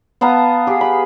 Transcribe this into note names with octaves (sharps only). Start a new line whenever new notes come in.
B3 F5 A5 A#5
G4 G#4
B5